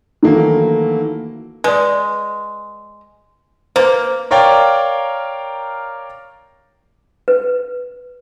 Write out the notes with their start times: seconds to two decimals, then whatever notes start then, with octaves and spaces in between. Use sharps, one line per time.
0.23 D#3 E3 F#3 A3 A#3
1.64 G#3 B4 D5
3.76 A#3 B4 C5
4.31 A#4 C#5 D5 F5 G5 A#5
7.28 B4